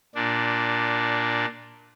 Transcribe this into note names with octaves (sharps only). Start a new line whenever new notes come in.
A#2 D4